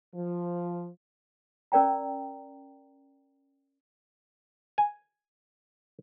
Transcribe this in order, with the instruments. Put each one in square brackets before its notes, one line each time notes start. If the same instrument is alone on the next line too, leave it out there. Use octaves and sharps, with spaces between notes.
[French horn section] F3
[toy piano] C#4 A#4 D5 G5 A#5
[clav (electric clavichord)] G#5